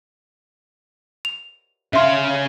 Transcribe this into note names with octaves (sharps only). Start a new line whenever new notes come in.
F7
C#3 E5 F5 C6